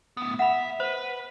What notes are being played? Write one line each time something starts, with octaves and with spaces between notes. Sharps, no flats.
A2 B3
E5 F#5 B5
B4 C5